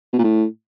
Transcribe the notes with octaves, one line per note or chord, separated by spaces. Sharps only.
B2
A#2
A2